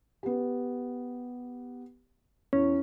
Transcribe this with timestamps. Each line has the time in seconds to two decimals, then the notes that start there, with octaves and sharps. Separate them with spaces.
0.23 B3 G4
2.53 E2 C#4